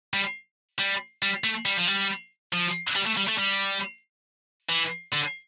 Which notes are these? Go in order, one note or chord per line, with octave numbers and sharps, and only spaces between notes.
G3
G3
G3
A3
G3
F3
G3
F3
G3
A3
G3
A3
G3
E3
D3